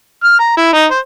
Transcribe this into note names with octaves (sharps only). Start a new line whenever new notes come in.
F6
A#5
E4
D#4
C5